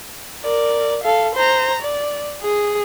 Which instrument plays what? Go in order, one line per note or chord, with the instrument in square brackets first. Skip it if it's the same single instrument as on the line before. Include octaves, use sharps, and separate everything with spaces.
[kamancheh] A#4 D5
A4 F5
C5 A#5
D5
G#4